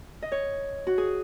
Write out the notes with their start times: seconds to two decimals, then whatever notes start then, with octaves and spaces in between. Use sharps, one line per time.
0.22 D#5
0.32 C#5
0.87 F#4
0.98 G#4